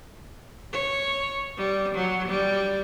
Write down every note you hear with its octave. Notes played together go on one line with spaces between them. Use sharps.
C#5
G3
F#3
G3